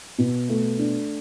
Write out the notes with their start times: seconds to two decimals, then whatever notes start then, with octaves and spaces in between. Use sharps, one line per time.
0.18 B2
0.49 A3
0.79 D4